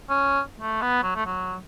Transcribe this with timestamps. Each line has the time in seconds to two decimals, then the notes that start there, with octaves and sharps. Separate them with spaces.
0.10 C#4
0.60 A3
0.82 B3
1.03 F#3
1.16 A3
1.26 F#3